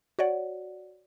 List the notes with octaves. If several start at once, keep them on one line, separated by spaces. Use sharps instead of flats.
F#4 C#5 D5 F#5